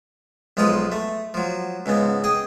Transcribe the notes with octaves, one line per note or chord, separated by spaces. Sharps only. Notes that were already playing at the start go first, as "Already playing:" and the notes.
B1 F3 G#3 D#4 F4 B4
A3
F3 F#3
C#2 G#2 C#3 B3
G#4 D#5 G5